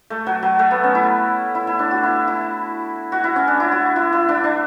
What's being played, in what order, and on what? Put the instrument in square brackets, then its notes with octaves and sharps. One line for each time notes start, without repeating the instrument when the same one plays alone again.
[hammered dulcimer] A3
F#3
F#3
A3
B3
C#4
E4
E4
E4
D4
F#4
E4
E4
F#4
E4
C#4
D4
E4
F#4
E4
E4
D4
D4